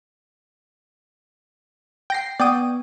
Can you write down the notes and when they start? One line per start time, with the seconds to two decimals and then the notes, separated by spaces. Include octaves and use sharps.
2.10 G5 A#6 C7
2.40 B3 D5 G5 D#6